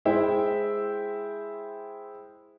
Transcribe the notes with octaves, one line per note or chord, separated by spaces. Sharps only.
G#3 E4 C5 E5 G5